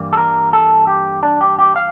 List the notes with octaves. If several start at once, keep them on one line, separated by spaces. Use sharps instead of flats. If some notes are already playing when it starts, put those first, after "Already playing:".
Already playing: G2 E3 G3 A#3
A4
A#4
A4
G4
D4
G4
G4
F5